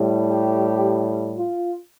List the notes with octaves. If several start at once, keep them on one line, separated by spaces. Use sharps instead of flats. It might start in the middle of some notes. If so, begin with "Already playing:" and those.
Already playing: A2 G3
G4
F4